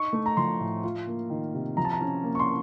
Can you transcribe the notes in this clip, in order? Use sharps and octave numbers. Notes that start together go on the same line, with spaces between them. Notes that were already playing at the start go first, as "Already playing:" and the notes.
Already playing: D#4 C#6
A3
A#5
F3 C6
A2
F4
A#3
D#3
C3
F3 A#5
A5
A#5
C#4
A#3
C#6
C6